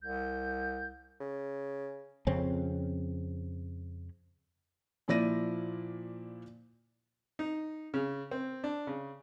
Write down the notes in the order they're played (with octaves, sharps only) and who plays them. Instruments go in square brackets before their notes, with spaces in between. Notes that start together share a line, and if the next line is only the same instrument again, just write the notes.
[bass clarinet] C2 [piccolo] G6
[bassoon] C#3
[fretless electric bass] F2 C#3 C4 C#4
[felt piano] A#2 F3 E4 D5 A#6 D#7
[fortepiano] D#4
C#3
C4
D4
C#3